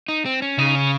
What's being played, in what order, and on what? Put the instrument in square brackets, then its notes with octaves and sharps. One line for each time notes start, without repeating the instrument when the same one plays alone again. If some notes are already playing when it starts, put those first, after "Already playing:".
[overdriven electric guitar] D#4
C4
C#4
[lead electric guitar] C#3 [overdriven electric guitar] D#4
[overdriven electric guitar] C#4